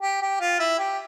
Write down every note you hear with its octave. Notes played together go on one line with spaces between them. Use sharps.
G4
G4
F4
E4
G4